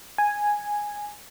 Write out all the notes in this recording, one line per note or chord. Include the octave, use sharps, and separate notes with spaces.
G#5